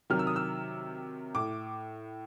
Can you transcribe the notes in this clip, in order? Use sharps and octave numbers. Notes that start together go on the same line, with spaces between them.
C3 D#3 F#3 F6
E6
D#6
E6
A2 D6